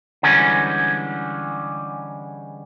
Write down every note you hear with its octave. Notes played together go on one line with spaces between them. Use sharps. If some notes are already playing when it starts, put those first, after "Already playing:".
D3 E3 G3 G#3 C#4